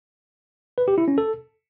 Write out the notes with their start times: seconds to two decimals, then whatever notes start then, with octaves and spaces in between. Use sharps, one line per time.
0.78 B4
0.88 G4
0.98 E4
1.08 C#4
1.18 A4